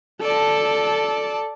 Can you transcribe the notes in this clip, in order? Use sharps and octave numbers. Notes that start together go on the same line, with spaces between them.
A4 D5 A5